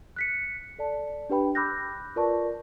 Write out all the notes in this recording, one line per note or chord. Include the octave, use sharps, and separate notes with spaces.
F#6 B6 C#7
A4 D5 A5
D4 G4 B4 G5 B5
B5 D6 E6 F#6 G6 A#6
F4 A#4 B4 D5 A5 C#6